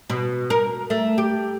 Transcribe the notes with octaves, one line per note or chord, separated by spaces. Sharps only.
B2
A#4
A3
G4